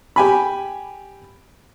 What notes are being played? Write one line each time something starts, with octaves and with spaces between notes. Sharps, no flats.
G4 G#5 B5